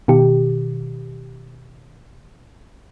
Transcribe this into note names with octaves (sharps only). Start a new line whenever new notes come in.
B2 D#3 G4